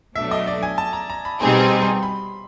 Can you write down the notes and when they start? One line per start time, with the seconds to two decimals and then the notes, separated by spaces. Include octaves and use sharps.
0.16 B2 F#3 A3 D4 E5
0.31 D#5
0.47 D5
0.63 G#5
0.78 A5
0.93 A#5
1.10 A#5
1.25 B5
1.40 B2 G3 C4 D#4 G#4 C6
1.61 C6
1.82 C6
2.03 B5